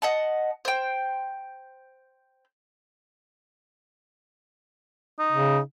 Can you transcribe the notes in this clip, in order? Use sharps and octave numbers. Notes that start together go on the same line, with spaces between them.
D#5 F#5 A5
C5 G5
D#4
C#3